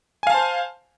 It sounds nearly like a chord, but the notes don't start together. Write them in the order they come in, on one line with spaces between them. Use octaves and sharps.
G#5 F5 A5 C5